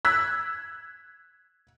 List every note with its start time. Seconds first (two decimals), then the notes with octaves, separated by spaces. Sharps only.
0.05 E6 F#6 G#6 B6